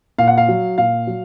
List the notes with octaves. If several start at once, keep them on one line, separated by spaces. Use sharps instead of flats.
A#2 F5
F#5
F5
F#3
A#2 F5
F#3